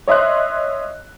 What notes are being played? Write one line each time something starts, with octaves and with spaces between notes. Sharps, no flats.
C#5 D#5 E5 C6 F#6